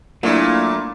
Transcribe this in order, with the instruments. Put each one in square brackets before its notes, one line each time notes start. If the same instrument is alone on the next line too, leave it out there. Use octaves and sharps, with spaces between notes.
[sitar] A#2 [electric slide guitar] F#3 A3 [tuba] A#3 [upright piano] D4 E4